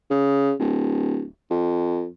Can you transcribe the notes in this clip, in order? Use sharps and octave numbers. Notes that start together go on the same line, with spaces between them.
C#3
D1
F2